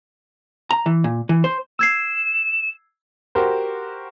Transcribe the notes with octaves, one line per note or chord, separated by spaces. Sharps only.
A#5
E3
A#2
E3
C5
E6 G#6 C7 E7
F#4 G4 A#4 C5